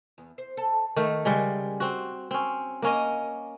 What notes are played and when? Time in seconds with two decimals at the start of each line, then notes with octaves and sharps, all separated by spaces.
0.18 E2
0.38 C5
0.57 A4
0.96 D#3 A3
1.25 C#3 G3 G#3
1.80 C4 F#4
2.31 C4 C#4
2.82 A#3 C#4 D#5